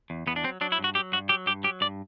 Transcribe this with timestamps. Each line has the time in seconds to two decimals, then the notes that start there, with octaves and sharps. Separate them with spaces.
0.10 E2
0.27 E2 B3
0.36 D4
0.44 F#3 C4
0.61 F#3 D4
0.72 E4
0.79 G2
0.84 F#4
0.95 F#3 G4
1.12 G2 F#4
1.29 F#3 G4
1.46 G2 G4
1.64 F#3 G4
1.81 G2 D5